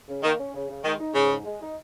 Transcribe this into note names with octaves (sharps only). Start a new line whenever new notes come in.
C#3
D#3 A#3
C#4
C#3
C#3
D#3 G#3
D#4
G#2 C#3
G#2
G#3
D#4